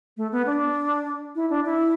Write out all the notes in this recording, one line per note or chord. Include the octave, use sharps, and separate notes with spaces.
A3
B3
D4
E4
D4
E4